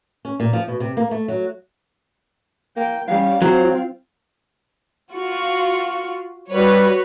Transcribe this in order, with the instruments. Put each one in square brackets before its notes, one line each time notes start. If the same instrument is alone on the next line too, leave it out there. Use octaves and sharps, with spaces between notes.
[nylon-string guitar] C#4
A#2
F3
B2
C3
A#3
A3
F#3
[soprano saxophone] A#3 [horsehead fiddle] G5
[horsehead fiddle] G3 C#4 [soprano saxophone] F5
[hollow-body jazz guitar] F#3 [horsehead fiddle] C4 F4 [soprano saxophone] C5
[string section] F4 F#4 C#7
[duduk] G3 [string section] F#4 B4 C#5